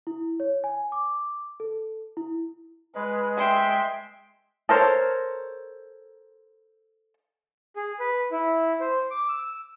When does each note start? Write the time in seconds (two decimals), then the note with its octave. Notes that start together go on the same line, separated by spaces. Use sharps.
0.07 E4
0.40 C#5
0.64 G#5
0.92 D6
1.60 A4
2.17 E4
2.95 G#3 B4
3.38 E5 G5 C6
4.69 A4 A#4 C5 C#5
7.76 G#4
8.00 B4
8.32 E4
8.81 C5
9.10 D6
9.29 E6